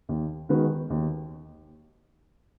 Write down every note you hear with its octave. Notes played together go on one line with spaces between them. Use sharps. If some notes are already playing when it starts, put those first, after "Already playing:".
D#2
D#3 G#3 B3 F#4
D#2